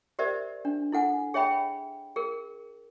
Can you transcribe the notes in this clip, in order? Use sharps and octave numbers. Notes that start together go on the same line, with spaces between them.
G4 A#4 C5 D5 E5
D4
E4 A4 F#5 G#5
G#4 C#5 E5 G5 B5
G#4 A#4